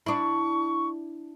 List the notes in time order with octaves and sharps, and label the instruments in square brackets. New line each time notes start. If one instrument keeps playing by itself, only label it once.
[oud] D4 E4 [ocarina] C#6